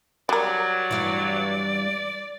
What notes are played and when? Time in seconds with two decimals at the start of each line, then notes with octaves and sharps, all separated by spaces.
0.29 F#3 G3 A#4 D5
0.91 G2 E3